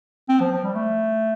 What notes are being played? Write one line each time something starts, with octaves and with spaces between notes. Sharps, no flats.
C4
F3
F3
G3
A3